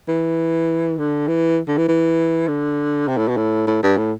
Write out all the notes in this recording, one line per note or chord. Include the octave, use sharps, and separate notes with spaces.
E3
D3
E3
D3
E3
E3
D3
C3
A2
B2
A2
A2
G2
A2